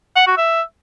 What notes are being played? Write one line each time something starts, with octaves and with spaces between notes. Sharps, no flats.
F#5
F#4
E5